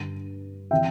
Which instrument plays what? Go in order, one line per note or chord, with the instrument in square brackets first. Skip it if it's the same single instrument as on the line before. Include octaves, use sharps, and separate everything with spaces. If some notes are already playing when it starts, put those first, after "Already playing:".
Already playing: [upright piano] G2 D3
C3 E3 E5 G5